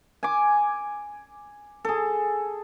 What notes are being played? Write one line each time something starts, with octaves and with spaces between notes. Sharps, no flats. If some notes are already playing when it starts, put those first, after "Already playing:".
G#5 D6
G#4 A4